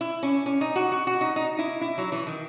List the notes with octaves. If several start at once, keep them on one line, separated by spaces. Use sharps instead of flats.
E4
C#4
C#4
D#4
F#4
F#4
F#4
D#4
D#4
E4
E4
F#3
E3
D#3